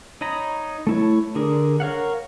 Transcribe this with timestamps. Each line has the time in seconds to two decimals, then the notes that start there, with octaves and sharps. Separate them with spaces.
0.21 D#4 C#5 D#5 A#5 B5
0.87 A3 E4 C#5
1.35 D3 D4 G#4 A#4
1.80 A#4 C#5 F5 F#5